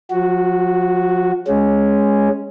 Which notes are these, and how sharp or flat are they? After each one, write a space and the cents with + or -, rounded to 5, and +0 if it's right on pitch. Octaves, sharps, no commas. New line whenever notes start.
F3 +35 F#4 +0
G#3 +0 C#4 +0